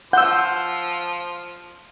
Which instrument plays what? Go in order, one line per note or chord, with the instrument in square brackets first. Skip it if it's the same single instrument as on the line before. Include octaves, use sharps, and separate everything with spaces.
[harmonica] F3 [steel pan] F#5 [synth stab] E6 G6